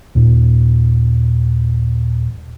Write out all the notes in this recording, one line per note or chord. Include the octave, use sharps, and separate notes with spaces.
D#2 A#2